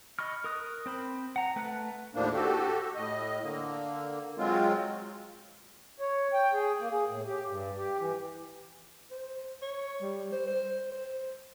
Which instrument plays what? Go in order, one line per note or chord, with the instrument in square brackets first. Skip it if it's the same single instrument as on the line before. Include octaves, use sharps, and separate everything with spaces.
[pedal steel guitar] D#5 B5 C#6 F6
A#4 D#6 F#6
C4 C5 B5
F#5 A#5
A3 B4 F#5 A5 F#6
[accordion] D#2 A2 F3 A#3 D4
F#4 G4 A4
A2 D#5
D3 A#3
F#3 G#3 C4 F4
[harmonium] C#5
G5
G#4
A#3
G#4
A2
G4
G2
G4
E3
[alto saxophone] C5
C#5
G3
C5
C5
C5